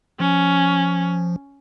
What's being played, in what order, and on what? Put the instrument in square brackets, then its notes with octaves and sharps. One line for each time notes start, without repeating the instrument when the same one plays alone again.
[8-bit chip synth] F3 [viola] C#4